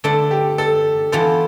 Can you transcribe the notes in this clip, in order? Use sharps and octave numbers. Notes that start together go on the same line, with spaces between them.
D3 A3 D4 A4
G4
A4
E3 B3 D4 F4 A4 C5